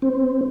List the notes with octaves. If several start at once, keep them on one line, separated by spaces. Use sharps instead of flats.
C4